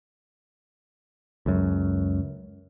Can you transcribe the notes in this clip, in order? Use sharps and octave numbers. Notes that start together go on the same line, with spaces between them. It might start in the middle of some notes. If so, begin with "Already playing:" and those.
C#2 F#2